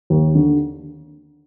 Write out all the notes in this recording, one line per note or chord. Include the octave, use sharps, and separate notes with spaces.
D#2
D3